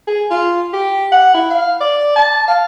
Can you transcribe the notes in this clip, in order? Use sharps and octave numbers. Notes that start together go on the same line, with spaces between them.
G#4
F4
G4
F#5
E4
F5
D5
A5
F5